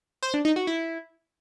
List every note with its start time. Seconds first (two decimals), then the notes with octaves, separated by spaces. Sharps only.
0.23 C5
0.34 D4
0.45 D#4
0.56 F#4
0.67 E4